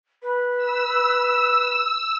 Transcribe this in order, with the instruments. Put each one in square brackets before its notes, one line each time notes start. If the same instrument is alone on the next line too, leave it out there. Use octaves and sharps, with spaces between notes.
[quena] B4
[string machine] E6